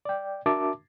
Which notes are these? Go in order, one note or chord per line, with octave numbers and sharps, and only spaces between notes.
D5 G5
D4 F#4 A#4 E5 A5 D6